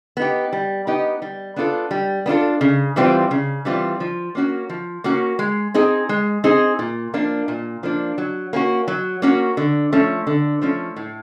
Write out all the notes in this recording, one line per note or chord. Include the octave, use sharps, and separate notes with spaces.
B3 D#4 G4
G3
B3 D#4 G4
G3
B3 D4 F4 A4
G3
B3 D4 F4 A4
C#3
E3 G3 C4 F4
C#3
E3 G3 C4 F4
F3
A#3 C#4 F#4
F3
A#3 C#4 F#4
G#3
C4 D#4 G#4
G#3
C4 D#4 G#4
A#2
F3 A#3 D4
A#2
F3 A#3 D4
F#3
A#3 C#4 F#4
F#3
A#3 C#4 F#4
D3
F3 A3 C#4
D3
F3 A3 C#4
A2